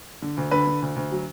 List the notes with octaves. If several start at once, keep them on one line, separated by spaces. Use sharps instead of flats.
D3
D2
D3 B4
D3
D2
D2
F#3